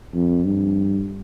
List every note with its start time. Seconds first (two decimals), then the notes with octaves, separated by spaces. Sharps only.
0.15 F2
0.45 G2